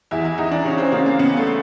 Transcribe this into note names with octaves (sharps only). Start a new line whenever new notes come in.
E2 E4
E4
E2 D#4
D4
C#3 C#4
C4
C#3 A#3
A#3
C#3 B3
A3